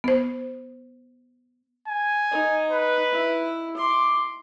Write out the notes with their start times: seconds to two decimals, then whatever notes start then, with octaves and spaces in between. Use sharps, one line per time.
0.04 B3 C5
1.88 G#5
2.31 D#4
2.71 B4
3.12 E4
3.77 C6 D6